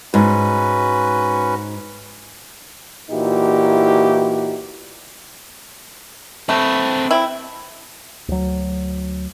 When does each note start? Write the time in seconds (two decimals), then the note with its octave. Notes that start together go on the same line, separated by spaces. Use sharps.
0.14 G#2 C#4 F#4 B4
3.10 A#2 E3 D#4 E4 F#4 G4
6.49 A3 C4 B4
7.11 C4 E4
8.28 D2 F#3